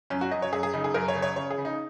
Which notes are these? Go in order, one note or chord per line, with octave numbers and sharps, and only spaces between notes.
F#2 C#4
F#4
F#2 D#5
C#5
F#2 G#4
G#4
C#3 D#4
G#4
F#2 A#4
C#5
C#3
C#5
C#3 C#5
G#4
C#3
D#4